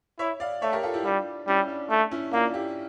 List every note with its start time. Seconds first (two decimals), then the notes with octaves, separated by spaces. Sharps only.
0.19 E4 C#5 E5
0.40 D5 F5
0.62 A3 C#5 E5
0.72 G4 A#4
0.83 F4 A4
0.94 E4 G4
1.04 G3 D4 F4
1.48 G3 C#4 E4
1.68 D4
1.90 A3 D4
2.11 C#4 E4
2.33 A#3 D4 F4
2.54 E4 G4